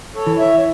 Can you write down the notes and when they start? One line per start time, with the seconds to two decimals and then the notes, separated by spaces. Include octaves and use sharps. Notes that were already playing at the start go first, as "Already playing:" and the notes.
0.15 A4 C#5
0.27 E3
0.39 C#5 E5